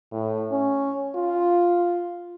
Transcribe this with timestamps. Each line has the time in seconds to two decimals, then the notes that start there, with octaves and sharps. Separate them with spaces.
0.12 A2
0.51 C#4
1.15 F4